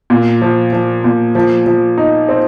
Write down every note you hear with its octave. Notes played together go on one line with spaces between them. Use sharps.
A#2
F3
F3
A#2
F3
F3
D#4
C4